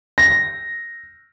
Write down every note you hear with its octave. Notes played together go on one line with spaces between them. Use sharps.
A#6